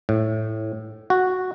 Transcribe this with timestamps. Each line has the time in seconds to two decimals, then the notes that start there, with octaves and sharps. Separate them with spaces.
0.09 A2
1.10 F#4